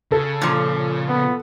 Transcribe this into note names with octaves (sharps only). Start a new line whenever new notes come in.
C#3 A4
A#2 F3
B3